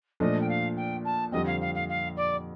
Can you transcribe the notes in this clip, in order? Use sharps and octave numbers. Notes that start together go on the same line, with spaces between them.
A#2 F3 A3 D4 D#5
G5
F5
G5
A5
F2 D3 G3 C4 D#5
F5
F5
F5
F5
D5